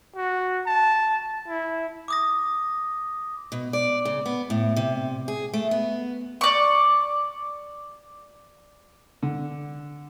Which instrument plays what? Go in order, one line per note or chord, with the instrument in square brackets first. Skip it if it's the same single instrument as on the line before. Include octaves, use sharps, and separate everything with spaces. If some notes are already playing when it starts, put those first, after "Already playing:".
[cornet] F#4
A5
E4
[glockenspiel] D6 D#6 A#6
[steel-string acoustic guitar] B2
D5
C#3
B3
A2
C3
G#4
A3
B3
[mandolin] D5 C#6
[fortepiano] D3